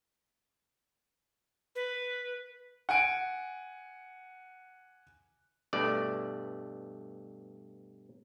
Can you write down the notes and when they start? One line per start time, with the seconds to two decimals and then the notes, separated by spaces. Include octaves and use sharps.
1.76 B4
2.89 F#5 G#5 D7
5.73 G2 B2 A3 D5